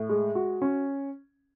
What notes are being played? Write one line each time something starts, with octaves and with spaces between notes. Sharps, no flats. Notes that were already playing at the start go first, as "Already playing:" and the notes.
Already playing: A2
G#3
F#4
C#4